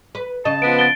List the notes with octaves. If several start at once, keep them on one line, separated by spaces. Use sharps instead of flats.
B4
C#3 D#5 A5
F3 B3 D7
A6 D7 G7